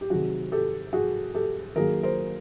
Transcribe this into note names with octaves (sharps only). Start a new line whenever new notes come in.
G4
C3 D#3 F#3 F#4 G#4
G4 A4
F#4 G#4
G4 A4
D#3 F#3 A#3 G#4 A#4
A#4 C5